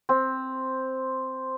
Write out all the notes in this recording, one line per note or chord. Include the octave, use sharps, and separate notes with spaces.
C4